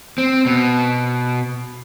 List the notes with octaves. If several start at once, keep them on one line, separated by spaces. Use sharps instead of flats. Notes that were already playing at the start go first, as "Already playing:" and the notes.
C4
B2